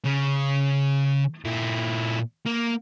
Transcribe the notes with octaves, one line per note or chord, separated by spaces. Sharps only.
C#3
A#2 E4
A#3